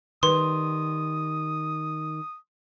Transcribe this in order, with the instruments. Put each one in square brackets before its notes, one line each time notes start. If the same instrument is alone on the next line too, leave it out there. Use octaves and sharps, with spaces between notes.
[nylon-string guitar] D#3 G3 [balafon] B4 [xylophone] C6 [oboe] D#6